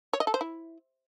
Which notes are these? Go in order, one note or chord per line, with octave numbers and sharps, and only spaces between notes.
C#5
D#5
A4
C5
E4